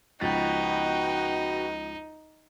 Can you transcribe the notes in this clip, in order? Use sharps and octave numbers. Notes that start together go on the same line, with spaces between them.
C#2 F3 D#4 F#4 B4 G5 A6